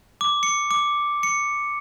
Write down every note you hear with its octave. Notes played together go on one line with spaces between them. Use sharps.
D6
C#7
D6
C#7